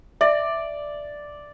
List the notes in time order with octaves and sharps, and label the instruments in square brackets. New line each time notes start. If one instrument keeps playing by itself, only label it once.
[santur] D5 [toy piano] E5